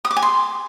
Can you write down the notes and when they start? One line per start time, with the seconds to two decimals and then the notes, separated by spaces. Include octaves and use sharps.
0.05 D#6
0.11 D6
0.16 G#5
0.22 C6